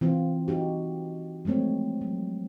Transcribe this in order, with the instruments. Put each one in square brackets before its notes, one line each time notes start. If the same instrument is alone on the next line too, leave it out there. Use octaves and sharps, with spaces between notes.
[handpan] E3 C4 F4
D#4 F#4 G4
F3 G#3 A3 C4 C#5
F#3